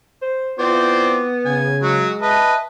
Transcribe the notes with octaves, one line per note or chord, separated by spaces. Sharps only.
C5
B3 C4 E4 F4 C5 D5
C#3 G#5
F#3 G#3 F#4
B4 D#5 E5 A5